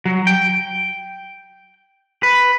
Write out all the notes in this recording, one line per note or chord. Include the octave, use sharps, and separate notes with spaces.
F#3
G5
B4